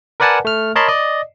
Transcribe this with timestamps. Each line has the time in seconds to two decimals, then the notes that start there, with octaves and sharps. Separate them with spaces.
0.20 A#4 B4 D5 F#5 G#5 A5
0.45 A3 F6
0.75 A#4 C#5 D#5 A5 B5 C6
0.88 D5 D#5